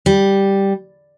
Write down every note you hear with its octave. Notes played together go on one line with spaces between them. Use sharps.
G3